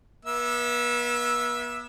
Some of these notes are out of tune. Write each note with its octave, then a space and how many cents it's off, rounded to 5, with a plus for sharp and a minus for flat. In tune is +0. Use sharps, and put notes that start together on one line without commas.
B3 -40 E5 +0 E6 +0